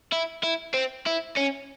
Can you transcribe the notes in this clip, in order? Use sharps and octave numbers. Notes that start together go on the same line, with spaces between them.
E4
E4
C4
E4
C#4